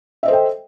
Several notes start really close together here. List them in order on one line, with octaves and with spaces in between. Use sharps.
E5 D#5 C5 A4 G5